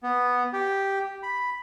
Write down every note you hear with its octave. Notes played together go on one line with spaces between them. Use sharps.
B3
G4
B5